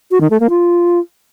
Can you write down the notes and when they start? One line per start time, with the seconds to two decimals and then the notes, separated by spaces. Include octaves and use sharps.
0.11 F#4
0.21 D#3
0.30 A3
0.40 A#3
0.50 F4